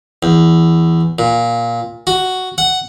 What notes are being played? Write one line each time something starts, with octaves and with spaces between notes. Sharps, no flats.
E2
A#2
F#4
F#5